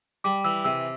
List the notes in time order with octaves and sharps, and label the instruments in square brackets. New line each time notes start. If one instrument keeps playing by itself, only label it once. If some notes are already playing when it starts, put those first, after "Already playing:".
[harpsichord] G3 [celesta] D6
[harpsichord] E3 [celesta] E6
[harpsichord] C3 [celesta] E6